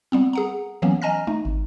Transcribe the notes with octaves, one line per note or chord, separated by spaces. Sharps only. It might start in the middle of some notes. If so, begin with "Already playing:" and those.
G3 B3 C4
G#4 F#5 A#5
E3 F#3 A#3 B3 C#4
D#5 G#5 A#5 F6 A#6
A3 D#4
G#1